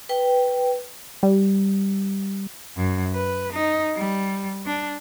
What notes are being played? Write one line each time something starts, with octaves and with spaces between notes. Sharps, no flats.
B4 G5
G3
F#2
B4
D#4
G3
D4